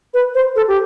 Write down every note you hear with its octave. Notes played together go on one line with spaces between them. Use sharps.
B4
C5
A4
G4